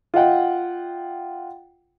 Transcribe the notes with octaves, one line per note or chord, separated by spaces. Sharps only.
F4 D#5 F#5 G5